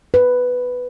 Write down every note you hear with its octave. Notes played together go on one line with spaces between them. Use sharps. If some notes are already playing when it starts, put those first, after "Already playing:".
B4